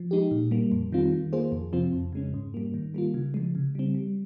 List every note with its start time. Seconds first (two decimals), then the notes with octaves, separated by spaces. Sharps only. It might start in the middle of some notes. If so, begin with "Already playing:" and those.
Already playing: F3
0.11 G#3 D#4 G4
0.31 A#2
0.51 G3 A#3
0.72 F2
0.92 D#3 G3 C4 F4
1.12 D#3
1.33 A#3 F4 G#4 C5
1.52 F2
1.73 C3 F3 C4 F4
1.93 F2
2.13 C#3 G#3 C#4
2.34 G#2
2.54 G3 A#3
2.74 D#3
2.94 G3 A#3 F4
3.14 C#3
3.34 F3 G#3
3.55 C#3
3.75 G3 C4
3.94 G3